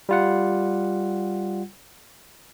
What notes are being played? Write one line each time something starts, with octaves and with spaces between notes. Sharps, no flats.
G3 F4 F#5